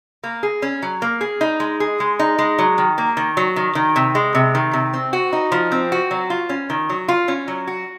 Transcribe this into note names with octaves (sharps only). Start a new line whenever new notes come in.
A#3
G#4
C#4
F#3
A#3
G#4
D#4
G#3
G#4
G#3
D#4
G#3
F#3
D#3
A#3
D#3
F#3
D#3
D#3
C3
G#3
C3
D#3
C3
C4
F#4
D#4
F3
C4
F#4
F#3
F4
C#4
D#3
F#3
F4
C#4
F#3
F#4